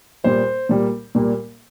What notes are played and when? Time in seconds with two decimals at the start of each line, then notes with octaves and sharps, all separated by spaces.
0.24 A#2 G3 A#3 C5
0.69 A#2 G3 A#3
1.15 A#2 G3 A#3